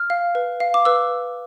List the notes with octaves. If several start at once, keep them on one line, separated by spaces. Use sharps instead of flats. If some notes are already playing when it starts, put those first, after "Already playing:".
Already playing: F6
F5
B4
F5
D6
B4 E6